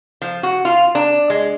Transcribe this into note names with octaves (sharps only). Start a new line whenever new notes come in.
F3
F#4
F4
D4
G#3